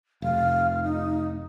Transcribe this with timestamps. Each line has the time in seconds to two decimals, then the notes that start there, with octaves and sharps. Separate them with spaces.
0.22 F1 F5
0.83 D#4